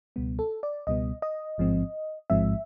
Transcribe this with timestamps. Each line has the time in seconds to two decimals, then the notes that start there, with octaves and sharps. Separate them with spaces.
0.16 C#2 B2 G3 B3
0.39 A4
0.63 D5
0.87 C#2 B2 G3 B3 D#5
1.22 D#5
1.58 A1 G#2 F3 G#3 C4
2.30 A1 G#2 F3 G#3 C4 E5